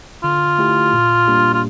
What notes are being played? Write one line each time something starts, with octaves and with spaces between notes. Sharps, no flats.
D3 F4
A3 E4 G4
A#2
G3 A#3 D4 G4
F4